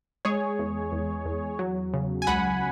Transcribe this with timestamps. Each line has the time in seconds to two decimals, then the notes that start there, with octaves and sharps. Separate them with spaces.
0.25 G#3 G#4 C#5
0.59 E2
0.92 E2
1.25 E2
1.59 F#3
1.94 C#3
2.22 G#5
2.27 C#2 F#5 B5